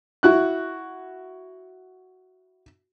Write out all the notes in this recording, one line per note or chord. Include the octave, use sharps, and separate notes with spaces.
E4 F#4 F#6